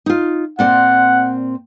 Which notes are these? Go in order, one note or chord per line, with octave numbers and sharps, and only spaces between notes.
D#4 F4
A#2 C4 D5 F#5